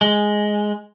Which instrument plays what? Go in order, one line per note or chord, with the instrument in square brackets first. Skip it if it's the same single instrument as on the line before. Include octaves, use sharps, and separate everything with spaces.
[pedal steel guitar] G#3